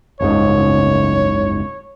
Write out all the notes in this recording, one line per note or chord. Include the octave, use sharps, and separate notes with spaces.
F#1 C#2 G#2 C#5